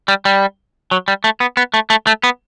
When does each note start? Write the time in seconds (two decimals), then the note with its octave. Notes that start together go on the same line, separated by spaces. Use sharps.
0.08 G3
0.25 G3
0.91 F#3
1.08 G3
1.24 A3
1.40 B3
1.57 B3
1.74 A3
1.90 A3
2.07 A3
2.23 B3